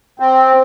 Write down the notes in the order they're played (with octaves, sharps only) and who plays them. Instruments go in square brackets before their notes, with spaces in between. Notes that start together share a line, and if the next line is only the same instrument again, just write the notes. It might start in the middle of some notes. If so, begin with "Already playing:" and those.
[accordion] C4